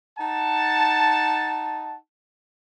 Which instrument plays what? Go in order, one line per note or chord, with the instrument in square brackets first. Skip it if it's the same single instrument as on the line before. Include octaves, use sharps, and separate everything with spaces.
[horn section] D#4 F#5 A5